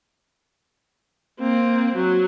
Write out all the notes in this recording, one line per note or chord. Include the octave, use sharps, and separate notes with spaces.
A#3 C4
F#3